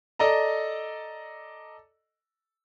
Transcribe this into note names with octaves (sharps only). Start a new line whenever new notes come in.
A4 D5 D#5 A#5